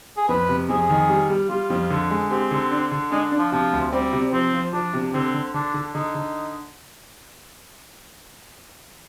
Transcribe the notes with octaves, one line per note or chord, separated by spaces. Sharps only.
G#4
F2 B4
C3
F2 G#4
D#3
G3
G3
G3 F4
F2
D3
G#3
C4 G4
D3
D4
D3
G#3 D4
D4
F3
C3 F3
D2
G3 C4
C3
F3 C4
F3
F3 D4
C3
D3 C4
D3
D3 D4
D3
D3 D#4
D3